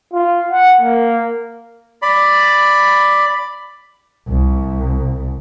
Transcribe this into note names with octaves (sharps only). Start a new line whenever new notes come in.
F4
F#5
A#3
D5 B5
C2